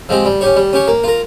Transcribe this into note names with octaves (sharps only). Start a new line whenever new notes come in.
F3 G#3 C4 G4
G3
C#4 G4 C#5
G3
C#4 G4 C#5
A#3
F4 A#4